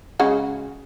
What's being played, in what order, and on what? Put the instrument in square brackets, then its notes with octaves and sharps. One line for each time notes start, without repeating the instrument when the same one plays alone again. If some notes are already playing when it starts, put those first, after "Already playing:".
[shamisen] C#3 G#3 F#4